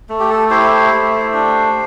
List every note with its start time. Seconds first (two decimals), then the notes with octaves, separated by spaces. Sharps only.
0.09 A3
0.20 G4
0.30 A4
0.50 E4 G4 C5
0.92 A3
1.33 D4